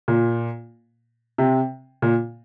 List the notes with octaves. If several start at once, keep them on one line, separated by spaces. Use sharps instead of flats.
A#2
C3
A#2